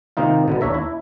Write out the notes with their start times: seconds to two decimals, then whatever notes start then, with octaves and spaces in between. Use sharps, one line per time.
0.17 C3 D#3 A#3 D#4 F4
0.48 B2 D3 B3
0.61 D#2 D4 C#5 E5 A#5
0.74 E4